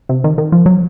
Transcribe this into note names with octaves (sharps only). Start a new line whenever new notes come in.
C3
D#3
D#3
F3
F#3